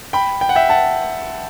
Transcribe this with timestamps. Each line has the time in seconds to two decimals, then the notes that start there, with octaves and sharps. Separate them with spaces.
0.13 G5 B5
0.41 G5
0.49 F#5
0.55 E5 G5
0.69 F#5 A5